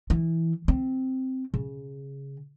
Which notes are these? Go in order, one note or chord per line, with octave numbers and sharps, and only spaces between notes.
E3
C4
C#3